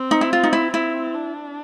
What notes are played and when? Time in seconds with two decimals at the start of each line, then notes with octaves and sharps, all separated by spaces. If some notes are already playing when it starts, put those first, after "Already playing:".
Already playing: C4
0.11 D#4
0.21 E4
0.33 F4
0.43 D#4
0.53 E4
0.73 C4 E4
1.14 D4